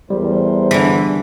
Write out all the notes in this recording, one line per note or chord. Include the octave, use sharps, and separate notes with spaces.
E2 A2 G3 A#4 C5
D3 E3